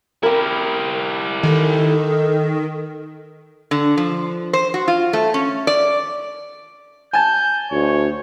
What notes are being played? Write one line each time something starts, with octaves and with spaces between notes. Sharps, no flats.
E4 G4 A#4 B5
D#3 A4
D3
F3
C5
F#4
F4
A3
C#4
D5
G#5 A5 G6
D2 C#5